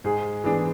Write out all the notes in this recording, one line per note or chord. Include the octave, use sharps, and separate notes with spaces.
G#2 G#4
E3 B3 D4 G#4